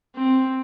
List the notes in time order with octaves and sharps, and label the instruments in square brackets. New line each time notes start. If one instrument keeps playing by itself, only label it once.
[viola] C4